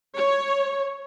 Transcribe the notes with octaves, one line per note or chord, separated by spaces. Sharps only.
C#5